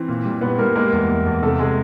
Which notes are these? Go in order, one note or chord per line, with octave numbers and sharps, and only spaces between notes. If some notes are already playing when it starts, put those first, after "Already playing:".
Already playing: E3 C4
A#2
G3
A#2 B3 B4
G3 A#3 A#4
G#3 A#3 A#4
E2
E2
E2
C3 A3 A4
G#3 G#4